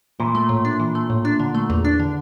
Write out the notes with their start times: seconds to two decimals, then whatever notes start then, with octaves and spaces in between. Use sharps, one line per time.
0.20 A#2 E3
0.35 A3
0.49 A2
0.65 D4
0.80 E3
0.95 A3
1.10 A2
1.25 D4
1.40 D3
1.55 A3
1.70 E2
1.85 D4
2.00 D3